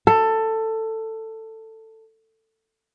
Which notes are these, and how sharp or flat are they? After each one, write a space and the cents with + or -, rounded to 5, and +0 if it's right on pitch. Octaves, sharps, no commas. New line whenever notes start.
A4 +15